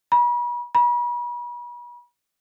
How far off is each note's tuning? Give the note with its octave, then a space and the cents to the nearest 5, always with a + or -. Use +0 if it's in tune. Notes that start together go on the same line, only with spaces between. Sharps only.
B5 -40
B5 -40